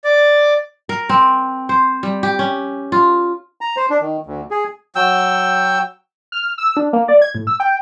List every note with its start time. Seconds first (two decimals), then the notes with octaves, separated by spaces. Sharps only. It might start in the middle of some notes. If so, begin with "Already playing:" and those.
0.04 D5
0.89 A#4
1.09 C4
1.69 C5
2.03 G3
2.23 G4
2.39 C#4
2.92 F4
3.61 A#5
3.77 C5
3.90 D4
4.01 D#3
4.27 D2
4.51 G#4
4.96 F#3 G5 E6
6.32 F6
6.58 E6
6.77 D4
6.93 A#3
7.08 D5
7.21 G#6
7.35 A2
7.47 E6
7.60 G5